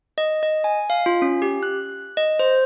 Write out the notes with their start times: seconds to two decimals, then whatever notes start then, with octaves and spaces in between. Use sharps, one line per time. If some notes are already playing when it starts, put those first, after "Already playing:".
0.18 D#5
0.43 D#5
0.64 G#5
0.90 F5
1.06 F4
1.22 C#4
1.42 G4
1.63 F#6
2.17 D#5
2.39 C5